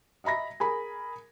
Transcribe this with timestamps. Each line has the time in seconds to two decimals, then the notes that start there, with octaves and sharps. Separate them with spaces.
0.24 D#5 E5 A#5 B5 A#6
0.60 G#4 A#4 B5